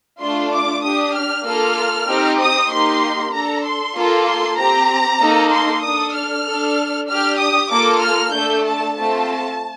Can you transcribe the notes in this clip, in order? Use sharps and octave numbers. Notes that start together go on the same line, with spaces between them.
A3 D4 F4 C6
D6
D4 G4 D#6
F6
A#3 F4 A4 F6
C4 D#4 G4
D#6
A#3 D#4 G4 C6
D4 A4 A#5
C6
A#3 F4 A4
C6
C4 G4 A#5
A#3 D#4 A4
C6
D4 A4 D#6
F6
D4 A4
D4 G4 F6
D#6
A#3 F4 A4 D6
F6
A3 D4 A4 G6
A5
A3 C4 F4 A4 A5